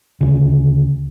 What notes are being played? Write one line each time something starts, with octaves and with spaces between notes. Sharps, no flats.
D2 C#3